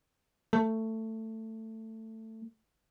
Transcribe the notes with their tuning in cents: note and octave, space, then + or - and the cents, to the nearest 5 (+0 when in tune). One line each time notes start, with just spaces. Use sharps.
A3 +15